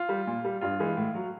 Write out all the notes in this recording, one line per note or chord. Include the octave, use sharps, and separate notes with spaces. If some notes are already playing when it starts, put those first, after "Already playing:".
Already playing: F4
G3
A#2
G3
G2 F4
E3 G#3
A2
F#3